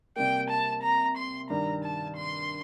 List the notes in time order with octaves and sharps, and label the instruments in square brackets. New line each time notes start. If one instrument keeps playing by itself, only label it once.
[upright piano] C3 G3 A#3 [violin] G5
[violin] A5
A#5
C6
[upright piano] G2 D#3 G3 [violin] A#5
[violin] A5
C6